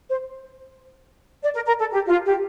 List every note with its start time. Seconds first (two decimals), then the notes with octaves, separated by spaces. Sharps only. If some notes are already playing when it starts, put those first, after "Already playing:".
0.09 C5
1.43 D5
1.54 A#4
1.66 A#4
1.79 A4
1.92 G4
2.08 F4
2.26 G4